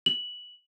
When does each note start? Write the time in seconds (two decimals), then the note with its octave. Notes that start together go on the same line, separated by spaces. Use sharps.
0.06 F#7